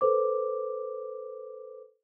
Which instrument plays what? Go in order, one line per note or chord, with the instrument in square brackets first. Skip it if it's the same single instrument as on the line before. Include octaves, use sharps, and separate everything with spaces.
[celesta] A4 B4 C5 D6